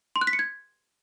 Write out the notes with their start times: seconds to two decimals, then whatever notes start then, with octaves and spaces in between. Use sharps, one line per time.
0.16 C6
0.21 F#6
0.27 B6
0.33 C#7
0.39 G#6